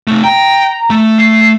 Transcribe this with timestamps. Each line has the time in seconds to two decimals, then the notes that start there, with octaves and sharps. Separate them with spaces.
0.07 C3 A3
0.24 G5 A#5
0.90 A3
1.19 A3 C7